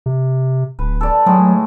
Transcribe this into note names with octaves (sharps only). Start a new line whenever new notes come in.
C3
D1 B4
A4 D5
A2 D#3 F#3 G#3